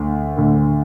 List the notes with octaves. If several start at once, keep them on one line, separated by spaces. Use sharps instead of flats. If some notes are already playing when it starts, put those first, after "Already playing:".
Already playing: D2 D3
D2 D3